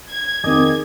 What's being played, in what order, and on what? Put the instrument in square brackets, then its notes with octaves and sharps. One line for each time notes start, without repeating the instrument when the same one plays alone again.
[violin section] G#6
[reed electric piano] F2 C4 [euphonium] D#3 [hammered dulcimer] G#4 D5 D#5